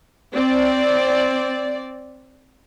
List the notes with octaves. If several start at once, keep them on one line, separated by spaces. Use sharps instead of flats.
C4 D5